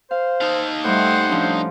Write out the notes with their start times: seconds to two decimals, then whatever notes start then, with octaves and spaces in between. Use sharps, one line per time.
0.11 C5 F5
0.41 D#4 F5 A5
0.85 A2 G3 A3 C5 F#5
1.29 F3 C#4 D4